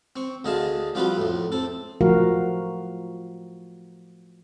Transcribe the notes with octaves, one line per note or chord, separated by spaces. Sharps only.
C4 C#6
D2 D3 G#4 D#5 F5 A5
F3 G3 C4 F4 F#4 B4
F2 A2
C4 A4
F3 A3 F#4 A#4 F5